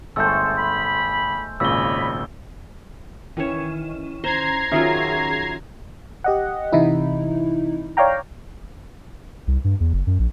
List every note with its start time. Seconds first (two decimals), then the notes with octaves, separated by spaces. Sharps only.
0.16 G1 G#3 A3 A4 C5 E6 G6
0.57 B5
1.60 G#1 A#2 C#3 C#5 D#5 B5 E6 G7
3.37 D#3 E3 C#4 C#5 E7
4.24 C5 A#5 G#6 C7
4.71 D#3 F#3 C#4 F4 G#4 E5
6.24 G4 D#5 F#5
6.72 C3 E3 D#4 E4
7.97 C#5 D5 F5 G5 A#5
9.47 C2
9.64 G2
9.80 E2
9.93 F#1
10.07 F#2
10.19 A#1